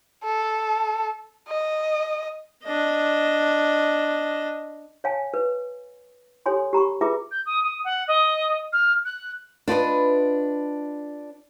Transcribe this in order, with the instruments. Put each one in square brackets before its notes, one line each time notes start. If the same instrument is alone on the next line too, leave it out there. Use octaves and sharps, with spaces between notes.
[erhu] A4
D#5
[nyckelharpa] D4 D#5
[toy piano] C#5 F5 G#5 A5
B4
G4 A4 C#5 G#5 C6
G4 A#5 B5 C#6
F4 G#4 B4 E5 A#5 D6
[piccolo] G6
D#6
D#6
F#5
D#5
F6
F#6
[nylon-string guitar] D4 F4 B4 D#5